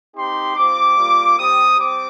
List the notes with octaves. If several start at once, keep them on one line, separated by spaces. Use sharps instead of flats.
C4 D#4 G4 C6
G3 C4 F4 D6
G3 A#3 F4
G3 C4 G4 D#6
G3 C4 D6